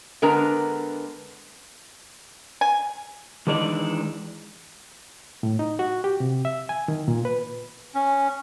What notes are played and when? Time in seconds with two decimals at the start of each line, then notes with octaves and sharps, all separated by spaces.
0.22 D3 G#3 B3 D4 A#4 A#5
2.61 G#5
3.47 D#3 E3 G#3 D4 D#4 D5
5.43 A2
5.59 D#4
5.79 F#4
6.04 G4
6.20 C3
6.45 E5
6.69 G#5
6.88 D#3
7.08 A#2
7.25 B4
7.95 C#4